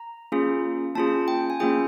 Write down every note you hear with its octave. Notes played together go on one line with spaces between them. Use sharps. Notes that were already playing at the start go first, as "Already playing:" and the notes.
Already playing: A#5
A#3 C#4 F4 G#4
A#3 C#4 F4 G#4 A5
G5
G#5
A#3 C#4 F4 G#4 G5